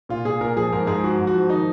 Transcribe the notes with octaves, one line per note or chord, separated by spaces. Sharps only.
A#2 F4
A#2 G#4
A#2 A#4
F3 G#4
G#2 A#4
G#2 G#4
F3 F#4
G#2
F#4
F3
D#3 D#4